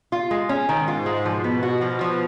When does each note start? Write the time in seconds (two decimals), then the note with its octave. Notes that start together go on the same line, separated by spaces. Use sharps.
0.12 F4
0.31 G#3
0.49 C#4
0.68 G#2 D#3
0.88 F4
1.06 G#3
1.25 B2 F3
1.44 B3
1.63 F#4
1.81 F3
2.01 F3